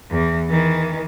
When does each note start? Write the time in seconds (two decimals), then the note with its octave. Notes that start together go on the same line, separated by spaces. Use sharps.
0.11 E2 E3
0.50 D#3 E3